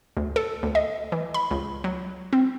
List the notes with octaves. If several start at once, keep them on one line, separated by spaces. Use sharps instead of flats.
D2
A4
D2
D#5
E3
B5
C#2
F#3
C4